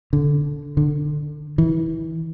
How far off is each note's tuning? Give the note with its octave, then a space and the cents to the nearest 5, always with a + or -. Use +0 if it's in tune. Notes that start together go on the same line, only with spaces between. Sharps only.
D3 -10
D3 +20
E3 -25